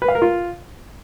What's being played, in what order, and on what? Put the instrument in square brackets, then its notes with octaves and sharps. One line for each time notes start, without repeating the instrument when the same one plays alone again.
[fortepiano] B4
F5
A#4
F4